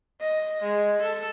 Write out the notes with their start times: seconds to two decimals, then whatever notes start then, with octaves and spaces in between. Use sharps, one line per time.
0.21 D#5
0.62 G#3
1.02 A4